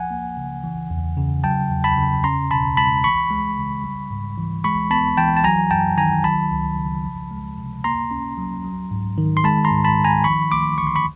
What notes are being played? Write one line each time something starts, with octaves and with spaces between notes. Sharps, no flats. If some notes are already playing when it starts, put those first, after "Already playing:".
Already playing: F3 F#5 G#5
A#3
C#3
E3
E2
C#3
F#3 G5 A5
E2
A5 B5
C#3
C#4 A#5 C6
B2 A5 B5
G#3 A5 B5
E3 B5 C#6
G#3
C#3
G3
G#2
E3
G#3 B5 C#6
B3 A5 B5
E3 G5 A5
A5
F#3 G#5 A#5
F#2 G5 A5
D#3 G#5 A#5
F#3 A5 B5
C#2
C#3
F3
G#3
C3
A#3 A#5 C6
C#4
F#3
F#3
G#2
D#3
C6
G#3 A5 B5
A#5 C6
G#2
A5 B5
D#3
G#5 A#5
F3 B5 C#6
A3 C6 D6
D3 C#6
C6
B5 C#6